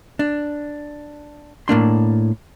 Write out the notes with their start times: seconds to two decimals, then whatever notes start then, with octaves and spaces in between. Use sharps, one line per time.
0.19 D4
1.68 A2 A#3 D4 C6